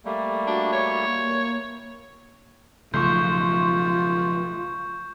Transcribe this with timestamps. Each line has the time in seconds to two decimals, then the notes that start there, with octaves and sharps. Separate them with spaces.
0.05 G3 A3 A#3
0.47 D4 F#4
0.73 C#5
1.06 A#3
2.94 B1 C#3 F3 A3 F4 C6 C#6 G6